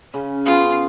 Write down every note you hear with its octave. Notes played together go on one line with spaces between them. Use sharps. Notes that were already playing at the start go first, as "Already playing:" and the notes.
C#3 C#4
C#3 B3 F4 F5